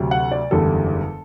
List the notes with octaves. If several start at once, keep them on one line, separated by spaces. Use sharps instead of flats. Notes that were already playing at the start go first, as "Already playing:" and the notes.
Already playing: D2 C3 F#3
F#5
D5
F#1 E2 D3 G3 A4